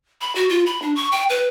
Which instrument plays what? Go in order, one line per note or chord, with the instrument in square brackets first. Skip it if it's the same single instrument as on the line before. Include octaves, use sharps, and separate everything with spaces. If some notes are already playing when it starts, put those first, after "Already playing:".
[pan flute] B5
F#4
F4
B5
D4
C#6
G5
B4